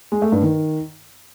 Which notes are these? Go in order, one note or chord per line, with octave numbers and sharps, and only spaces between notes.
G#3
A3
G2
D#3